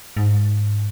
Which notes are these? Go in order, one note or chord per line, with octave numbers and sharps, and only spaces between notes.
G#2